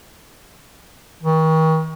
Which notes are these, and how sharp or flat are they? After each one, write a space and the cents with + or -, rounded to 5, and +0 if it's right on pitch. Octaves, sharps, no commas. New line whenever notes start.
D#3 +40